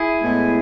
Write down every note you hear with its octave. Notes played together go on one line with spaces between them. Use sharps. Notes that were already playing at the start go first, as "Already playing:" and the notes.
Already playing: E4 G#4
A2 G#3 B3